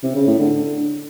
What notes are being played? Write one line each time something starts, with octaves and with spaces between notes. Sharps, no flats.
C3
C#3
A2
D3